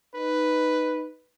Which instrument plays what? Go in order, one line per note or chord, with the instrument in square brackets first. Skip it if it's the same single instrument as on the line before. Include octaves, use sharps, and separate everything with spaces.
[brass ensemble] D#4 B4